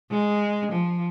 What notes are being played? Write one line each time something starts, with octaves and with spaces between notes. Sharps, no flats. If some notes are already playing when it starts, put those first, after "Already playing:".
G#3
F3